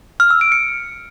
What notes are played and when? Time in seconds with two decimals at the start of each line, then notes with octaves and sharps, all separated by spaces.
0.20 F6
0.31 E6
0.41 D7
0.52 C#7